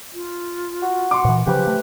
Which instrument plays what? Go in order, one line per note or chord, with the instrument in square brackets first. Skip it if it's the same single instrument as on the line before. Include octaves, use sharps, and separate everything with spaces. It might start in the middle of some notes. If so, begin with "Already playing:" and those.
[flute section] F4
[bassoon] F#4
[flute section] F#5 [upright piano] C6 D6
[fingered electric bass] A#2 E3
[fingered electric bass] C#3 F3 F#3 [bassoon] G4 [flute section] B4 C5 F#6
[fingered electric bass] A3